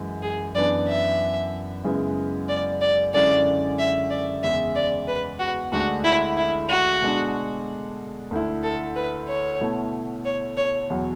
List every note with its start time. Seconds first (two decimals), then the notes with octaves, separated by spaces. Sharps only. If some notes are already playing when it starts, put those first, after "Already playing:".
Already playing: F#2 E3 G#3
0.22 G#4
0.55 F#2 E3 B3 D4 D5
0.88 E5
1.84 F#2 C#3 G#3 B3 E4
2.49 D5
2.81 D5
3.14 F#2 D3 G#3 C#4 E4 D5
3.79 E5
4.10 D5
4.43 E2 C#3 G#3 E5
4.75 D5
5.08 B4
5.40 F#4
5.72 D2 D3 G#3 D4 F#4
6.04 E4
6.37 E4
6.69 F#4
7.02 B2 G#3 D4
8.31 D2 D3 A3 E4
8.63 A4
8.96 B4
9.29 C#5
9.61 B2 A3 E4
10.25 C#5
10.57 C#5
10.90 E2 B2 F#3